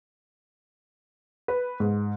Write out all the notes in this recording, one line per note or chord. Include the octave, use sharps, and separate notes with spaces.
B4
G#2